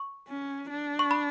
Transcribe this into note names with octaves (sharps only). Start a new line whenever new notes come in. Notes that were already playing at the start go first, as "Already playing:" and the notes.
Already playing: C#6
C#4
D4
C#6
B5